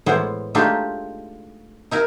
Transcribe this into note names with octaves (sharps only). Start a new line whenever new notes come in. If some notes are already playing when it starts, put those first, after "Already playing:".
A2 E3 G#3 B3 C5
G#3 A3 D4 D#4 F4 G4
D#4 E4 A#4